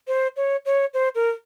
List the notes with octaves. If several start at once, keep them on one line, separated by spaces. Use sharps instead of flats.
C5
C#5
C#5
C5
A#4